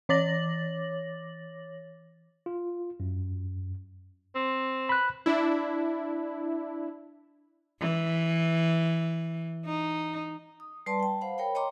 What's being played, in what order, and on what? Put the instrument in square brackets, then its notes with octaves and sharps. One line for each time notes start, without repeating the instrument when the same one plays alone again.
[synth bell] E3 C#5 D6 A6 A#6 F#7
[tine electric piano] F4
F#2
[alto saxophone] C4
[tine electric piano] B5 F#6
[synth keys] D4 E4
[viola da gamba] E3
D#4
[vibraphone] D#6
G3 B4 D5 A5 C6
G5 A5
C5 F5 F#5 B5
A#4 C#5 G5 B5
C#5 D#5 G5 A#5 C6 D6